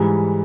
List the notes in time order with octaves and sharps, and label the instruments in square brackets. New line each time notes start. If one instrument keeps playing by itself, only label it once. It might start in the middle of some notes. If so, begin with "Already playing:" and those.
Already playing: [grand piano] G#2 E3 G3